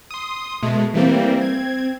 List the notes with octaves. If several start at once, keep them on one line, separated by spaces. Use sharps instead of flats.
C6 D#6
B2 G#3 A3
E3 G3 A3 A#3 C4
C4 G#6